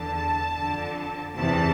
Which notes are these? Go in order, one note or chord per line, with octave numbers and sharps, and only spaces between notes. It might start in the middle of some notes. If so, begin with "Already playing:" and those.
Already playing: E2 D3 A5
F2 D3
E2 C3 E3 A5